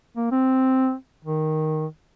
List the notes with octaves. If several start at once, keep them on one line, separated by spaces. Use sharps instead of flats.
A#3
C4
D#3